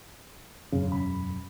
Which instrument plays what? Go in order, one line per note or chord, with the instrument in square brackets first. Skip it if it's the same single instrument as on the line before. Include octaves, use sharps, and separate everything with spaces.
[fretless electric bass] E1 F#2 C#4 [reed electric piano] C#3
[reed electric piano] B5